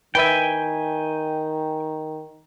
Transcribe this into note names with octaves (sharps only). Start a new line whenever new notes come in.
D#3 E3 B3 E5 G5 G#5